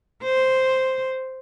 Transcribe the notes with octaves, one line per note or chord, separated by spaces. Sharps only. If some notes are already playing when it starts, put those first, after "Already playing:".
C5